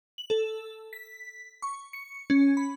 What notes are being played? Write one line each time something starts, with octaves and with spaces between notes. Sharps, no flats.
F#7
A4
B6
C#6
C#7
C#4
B5